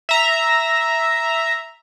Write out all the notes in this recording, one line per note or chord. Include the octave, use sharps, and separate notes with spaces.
E5 A#5